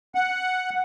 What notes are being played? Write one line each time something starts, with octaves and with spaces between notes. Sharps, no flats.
F#5